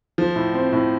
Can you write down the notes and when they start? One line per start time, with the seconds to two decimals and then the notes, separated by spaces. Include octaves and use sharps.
0.18 F3
0.36 A2
0.54 C4
0.72 A2